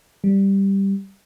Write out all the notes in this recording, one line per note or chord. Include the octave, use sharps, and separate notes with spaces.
G3